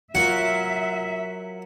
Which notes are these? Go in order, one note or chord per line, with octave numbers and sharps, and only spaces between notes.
F#3 F4 A#4 E5 F#5